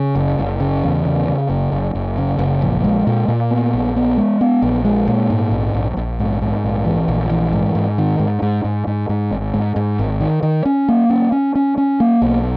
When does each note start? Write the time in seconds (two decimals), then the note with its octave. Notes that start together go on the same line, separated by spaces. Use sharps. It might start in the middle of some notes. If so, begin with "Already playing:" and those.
Already playing: C#3
0.15 F#1
0.39 F#1
0.60 C#3
0.84 E2
1.05 C#3
1.28 C#3
1.49 F#1
1.72 F#1
1.95 F#1
2.18 C#3
2.39 F#1
2.62 A#1
2.84 G#3
3.07 A#2
3.28 A#2
3.51 B3
3.74 A#1
3.96 B3
4.17 G#3
4.41 B3
4.62 A#1
4.85 G#3
5.08 A#2
5.30 G#2
5.51 A#1
5.74 A#1
5.97 A#1
6.19 G#2
6.42 G#2
6.64 A#1
6.86 E3
7.08 A#1
7.30 E3
7.53 G#2
7.75 G#2
7.98 D#3
8.20 G#2
8.42 G#2
8.64 G#2
8.87 G#2
9.09 G#2
9.31 G#1
9.54 G#2
9.76 G#2
9.99 G#1
10.20 D#3
10.43 D#3
10.65 C#4
10.88 A#3
11.10 C#4
11.32 C#4
11.55 C#4
11.78 C#4
12.00 A#3
12.22 B1